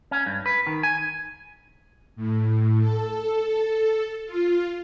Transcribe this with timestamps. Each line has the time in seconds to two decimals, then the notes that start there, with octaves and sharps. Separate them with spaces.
0.11 C#4
0.26 G2
0.46 B4
0.67 D#3
0.83 G#5
2.16 A2
2.79 A4
4.26 F4